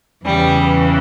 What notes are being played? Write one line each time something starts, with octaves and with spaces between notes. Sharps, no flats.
E2 C#3 E3 G3